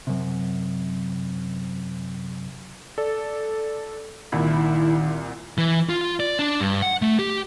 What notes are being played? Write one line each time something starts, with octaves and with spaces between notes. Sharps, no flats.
F#2 C3
A4 D5
C2 A#2 D#3 E4
E3
F4
D5
D4
G2
F#5
A3
G4